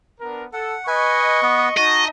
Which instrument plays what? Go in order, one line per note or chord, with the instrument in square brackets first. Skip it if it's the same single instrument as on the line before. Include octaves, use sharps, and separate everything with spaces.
[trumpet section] B3 D4 A#4
[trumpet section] A4 [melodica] F#5
[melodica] B4 G#5 [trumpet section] D#5 C#6
[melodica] B3 B4
[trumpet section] D#4 A5 [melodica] F#4 [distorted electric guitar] D#5